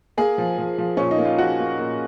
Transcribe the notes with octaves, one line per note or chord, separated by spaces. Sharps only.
A#3 G#4
F3
F3
F3
A#2 C#4
D#4
A#3
F4
F3 F#4
A#3
A#2